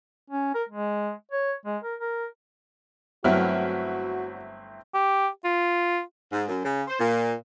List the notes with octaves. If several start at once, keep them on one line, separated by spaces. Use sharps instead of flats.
C#4
A#4
G#3
C#5
G#3
A#4
A#4
G1 F#3 A3 C4 E4 F#4 F6
G4
F4
G#2
F#2
C#3
C5
A#2